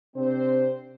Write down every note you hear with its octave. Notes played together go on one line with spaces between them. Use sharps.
C3 C4 D4 C5